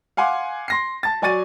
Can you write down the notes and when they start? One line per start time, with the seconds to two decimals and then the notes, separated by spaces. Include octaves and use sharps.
0.17 F5 F#5 G#5 C6 D6
0.68 C6 A#6 C7
1.03 A5 A6
1.22 F#3 D5 G#5 C#6 A6 D#7